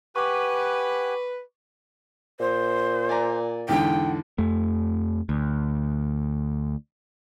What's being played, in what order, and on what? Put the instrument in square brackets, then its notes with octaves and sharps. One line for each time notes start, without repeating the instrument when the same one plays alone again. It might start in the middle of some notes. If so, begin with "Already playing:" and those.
[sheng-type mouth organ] G4 F#5 G#5 [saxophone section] B4 [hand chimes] C#6 D6
[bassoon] A#2 [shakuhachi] C5
[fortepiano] D5 G#5 A#5
[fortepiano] E2 G#2 D3 [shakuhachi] G5
[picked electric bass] F2 A3
D2